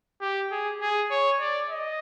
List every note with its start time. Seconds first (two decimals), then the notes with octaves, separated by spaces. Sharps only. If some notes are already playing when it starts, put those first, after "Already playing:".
0.21 G4
0.51 G#4
0.81 G#4
1.10 C#5
1.40 D5
1.70 D#5